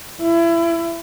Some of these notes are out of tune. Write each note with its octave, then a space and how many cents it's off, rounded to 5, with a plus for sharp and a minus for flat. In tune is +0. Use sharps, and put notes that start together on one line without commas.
E4 +30